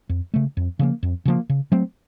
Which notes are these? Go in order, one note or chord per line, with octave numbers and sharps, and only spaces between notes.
F2
C#3 A3
F2
C#3 F3 A#3
F2
C#3 F3 A#3
C#3
F#3 A3 C4